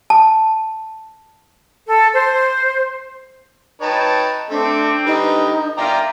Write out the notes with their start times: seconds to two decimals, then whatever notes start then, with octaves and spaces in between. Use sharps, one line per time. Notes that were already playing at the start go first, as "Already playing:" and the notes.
0.10 A5
1.88 A4
2.14 C5
3.82 D#4 B4 C#5 G5 A5
4.50 A3 C4 D4
5.06 D3 G3 D#4 B4
5.78 F4 A#4 D5 E5 G5 A#5